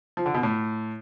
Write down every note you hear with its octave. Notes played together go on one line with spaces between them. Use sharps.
F3
D3
B2
A2